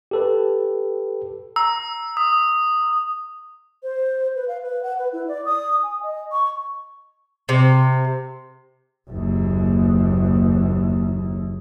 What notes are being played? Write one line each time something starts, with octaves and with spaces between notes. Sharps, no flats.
G4 A4 B4
A#5 E6
D#6
C5
B4
F5
B4
F#5
B4
E4
D5
D#6
G#5
D#5
C#6
C3
F#1 D#2